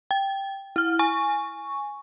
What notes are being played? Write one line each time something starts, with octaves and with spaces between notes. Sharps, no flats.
G5
E4 F6
G#5 C#6